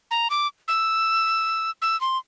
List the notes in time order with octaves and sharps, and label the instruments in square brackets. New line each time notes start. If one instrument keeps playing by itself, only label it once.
[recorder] A#5
D6
E6
E6
C6